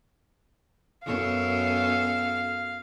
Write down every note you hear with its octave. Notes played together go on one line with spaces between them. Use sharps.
F#2 B3 A4 F5